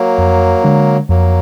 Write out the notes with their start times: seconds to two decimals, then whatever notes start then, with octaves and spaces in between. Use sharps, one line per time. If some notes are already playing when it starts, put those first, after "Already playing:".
Already playing: F#3 A#3
0.18 F2
0.64 D3 G#3 D4
1.09 F2 F#3 A#3